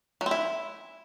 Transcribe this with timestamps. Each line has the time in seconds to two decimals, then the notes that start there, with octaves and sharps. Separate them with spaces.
0.21 F#3
0.26 C4
0.31 E4